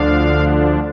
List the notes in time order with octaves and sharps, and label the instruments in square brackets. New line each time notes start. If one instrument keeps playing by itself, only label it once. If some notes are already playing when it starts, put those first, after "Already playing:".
Already playing: [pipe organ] D2 D3 F3 D4 F5